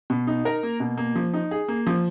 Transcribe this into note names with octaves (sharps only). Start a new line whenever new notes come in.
B2
D#4
A#4
A#3
B2
A#3
F3
D#4
G#4
A#3
F3